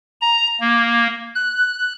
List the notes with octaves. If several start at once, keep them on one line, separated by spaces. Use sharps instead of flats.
A#5
A#3
F#6